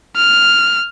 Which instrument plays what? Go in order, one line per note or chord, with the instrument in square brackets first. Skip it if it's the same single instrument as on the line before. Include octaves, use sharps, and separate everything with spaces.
[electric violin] F6